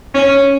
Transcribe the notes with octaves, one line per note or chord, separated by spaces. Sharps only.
C#4